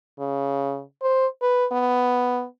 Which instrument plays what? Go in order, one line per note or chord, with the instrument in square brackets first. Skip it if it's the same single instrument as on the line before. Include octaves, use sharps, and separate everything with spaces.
[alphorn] C#3
C5
B4
B3